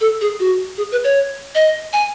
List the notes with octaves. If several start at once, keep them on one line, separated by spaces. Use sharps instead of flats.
A4
G#4
F#4
G#4
B4
C#5
D#5
G#5